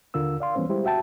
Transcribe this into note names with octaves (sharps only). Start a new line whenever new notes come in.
D#2 D3 F4 A#4 E6
D5 F5 C6
E3 G3 B3 C#4 C5
G3 G#3 E4 G4 C5
F#4 E5 G5 A5